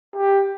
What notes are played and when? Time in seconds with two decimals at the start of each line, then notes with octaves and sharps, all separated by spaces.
0.16 G4